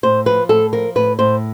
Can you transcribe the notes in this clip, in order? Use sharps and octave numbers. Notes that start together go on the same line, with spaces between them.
A2 C5
F3 B4
A2 A4
F3 A#4
A2 B4
A2 C5